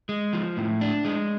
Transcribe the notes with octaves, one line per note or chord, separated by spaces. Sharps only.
G#3
F3
A2
D4
G#3